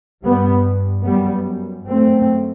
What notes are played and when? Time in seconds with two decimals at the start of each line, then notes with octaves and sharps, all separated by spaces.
0.26 G2 G3 B3
1.06 F#2 G3 B3
1.87 F#2 A3 C4